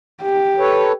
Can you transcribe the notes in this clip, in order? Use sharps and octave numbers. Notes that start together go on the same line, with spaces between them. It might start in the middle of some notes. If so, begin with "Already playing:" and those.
G4
A4 B4 C#5